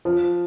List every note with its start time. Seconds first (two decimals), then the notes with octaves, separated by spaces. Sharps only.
0.05 F3